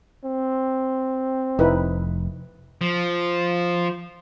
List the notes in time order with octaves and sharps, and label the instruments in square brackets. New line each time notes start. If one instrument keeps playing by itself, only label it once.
[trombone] C4
[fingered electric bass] F1 [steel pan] D#4 E4 B4
[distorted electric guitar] F3